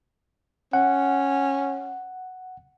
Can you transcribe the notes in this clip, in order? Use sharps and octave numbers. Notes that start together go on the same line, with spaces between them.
C#4 F#5